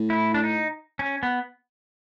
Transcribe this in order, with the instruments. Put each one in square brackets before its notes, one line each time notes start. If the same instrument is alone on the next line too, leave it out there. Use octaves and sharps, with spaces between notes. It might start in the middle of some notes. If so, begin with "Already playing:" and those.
Already playing: [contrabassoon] A2
[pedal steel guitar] E4
D4
D#4
C#4
B3